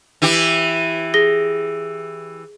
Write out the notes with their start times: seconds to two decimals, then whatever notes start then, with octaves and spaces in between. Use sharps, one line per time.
0.22 E3 E4 G4
1.14 G#4 A#6 G7